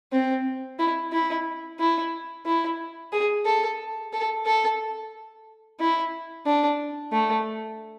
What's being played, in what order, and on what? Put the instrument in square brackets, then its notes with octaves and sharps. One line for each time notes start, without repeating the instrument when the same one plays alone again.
[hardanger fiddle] C4
E4
E4
E4
E4
G#4
A4
A4
A4
E4
D4
A3